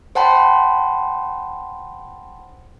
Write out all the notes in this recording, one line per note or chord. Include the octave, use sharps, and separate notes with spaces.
C5 F#5 G5 A5 B5 C6